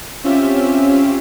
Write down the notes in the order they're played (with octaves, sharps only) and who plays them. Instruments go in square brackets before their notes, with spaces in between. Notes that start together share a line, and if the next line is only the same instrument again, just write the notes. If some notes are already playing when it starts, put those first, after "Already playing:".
[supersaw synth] C4 C#4 F4 G4 E5